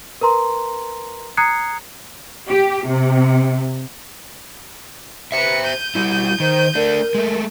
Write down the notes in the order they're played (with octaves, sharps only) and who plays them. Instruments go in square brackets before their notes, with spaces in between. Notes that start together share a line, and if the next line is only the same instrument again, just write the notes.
[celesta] A#4 B4 A#5 C6
A#5 D#6 F#6 G#6 C7 C#7
[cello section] G4
C3
[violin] B4 C#7 [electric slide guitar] C5 E5
[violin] G6 D#7
[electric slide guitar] G3 E4 [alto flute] F#4
[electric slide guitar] D#3 [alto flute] C5
[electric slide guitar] A3 D4 [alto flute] A#4
[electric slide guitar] G#3 A3